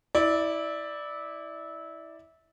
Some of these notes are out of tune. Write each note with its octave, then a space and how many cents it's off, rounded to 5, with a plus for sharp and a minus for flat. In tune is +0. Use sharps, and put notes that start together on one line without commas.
E4 -20 D5 +0